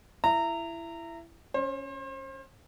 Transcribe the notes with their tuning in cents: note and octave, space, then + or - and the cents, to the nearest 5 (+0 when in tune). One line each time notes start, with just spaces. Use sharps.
E4 +20 A#5 -20
C#4 +0 C5 +35